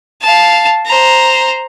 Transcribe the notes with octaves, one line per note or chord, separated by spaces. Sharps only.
F5 A5
C5 A#5